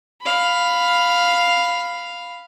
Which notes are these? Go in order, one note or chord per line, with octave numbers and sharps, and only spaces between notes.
F5 B5